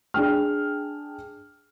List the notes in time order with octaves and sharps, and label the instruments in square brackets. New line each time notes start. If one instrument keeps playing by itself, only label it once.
[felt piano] D4 G#4 G5 F6